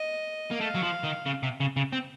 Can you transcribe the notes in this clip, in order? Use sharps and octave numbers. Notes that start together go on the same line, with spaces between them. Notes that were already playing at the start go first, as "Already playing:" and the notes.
Already playing: D#5
A#3
A3 F5
F#3
F3
D#3
C#3
C3
C#3
C#3
C4